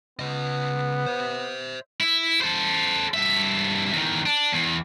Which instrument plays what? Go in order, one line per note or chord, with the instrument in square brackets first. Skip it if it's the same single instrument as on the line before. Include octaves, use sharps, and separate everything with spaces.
[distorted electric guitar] C#3 D#5 [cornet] B3
[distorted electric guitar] C5 E5
E4
A4 C5
G2 E5
E2 D#3
D4
E2